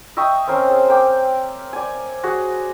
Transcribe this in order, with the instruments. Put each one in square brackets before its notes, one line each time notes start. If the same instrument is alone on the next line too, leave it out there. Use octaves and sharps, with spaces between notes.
[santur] D#5 E5 G5 C#6
C4 C#4 A#4 C5
G#4 A5
A#4 G5 D6
D5 G#5
F#4 G#4 F#5